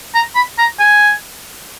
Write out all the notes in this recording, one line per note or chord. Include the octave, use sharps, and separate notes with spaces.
A#5
B5
A#5
G#5